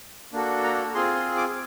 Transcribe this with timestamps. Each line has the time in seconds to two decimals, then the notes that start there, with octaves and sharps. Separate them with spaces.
0.33 A#3 D4 F#4 A4
0.64 A#5
0.95 C4 F4 G#4 C6
1.15 C6
1.36 D6